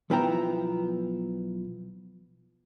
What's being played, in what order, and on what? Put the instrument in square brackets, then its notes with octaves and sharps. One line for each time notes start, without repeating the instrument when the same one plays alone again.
[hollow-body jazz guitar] B1 F3 B3 E4 G5 A#5